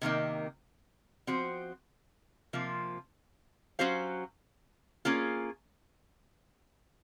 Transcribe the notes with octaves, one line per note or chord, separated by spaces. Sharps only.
C3 D#3 A#3 D#4
F3 C4 F#4 C5
C3 F3 A#3 F4
F#3 C#4 F#4 C5 F5
A#3 C#4 F4 G#4